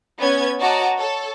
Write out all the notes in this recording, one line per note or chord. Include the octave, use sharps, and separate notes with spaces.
B3 C#4 G#6
F#4 C#5 D#5 A5 A#5 D6
A4 C#5